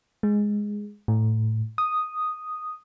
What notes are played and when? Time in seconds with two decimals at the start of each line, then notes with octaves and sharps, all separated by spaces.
0.23 G#3
1.08 A2
1.78 D#6